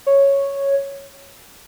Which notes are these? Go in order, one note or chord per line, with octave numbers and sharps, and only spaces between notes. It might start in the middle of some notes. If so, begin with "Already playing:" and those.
C#5